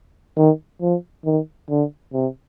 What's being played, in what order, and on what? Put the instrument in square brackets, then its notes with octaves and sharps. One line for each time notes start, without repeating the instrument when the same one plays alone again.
[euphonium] D#3
F3
D#3
D3
C3